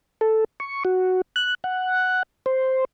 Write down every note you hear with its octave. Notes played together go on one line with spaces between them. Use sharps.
A4
C#6
F#4
F#6
F#5
C5